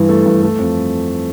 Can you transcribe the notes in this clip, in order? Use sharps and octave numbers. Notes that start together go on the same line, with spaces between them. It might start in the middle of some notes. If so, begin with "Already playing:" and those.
Already playing: G2 E3
A3
G2
A3
F2